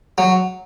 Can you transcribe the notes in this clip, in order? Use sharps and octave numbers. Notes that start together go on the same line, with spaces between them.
F#3